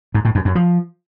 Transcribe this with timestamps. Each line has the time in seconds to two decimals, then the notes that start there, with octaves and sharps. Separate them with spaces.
0.14 G#2
0.25 A2
0.35 F#2
0.45 F#2
0.55 F3